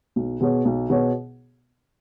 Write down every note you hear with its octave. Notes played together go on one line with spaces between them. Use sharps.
B1
B2 B3 G#4 C#5
B1
B2 B3 G#4 C#5